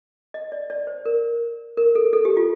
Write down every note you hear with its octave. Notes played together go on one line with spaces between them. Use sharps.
D#5
D5
D5
C5
A#4
A#4
A4
A4
G4
F4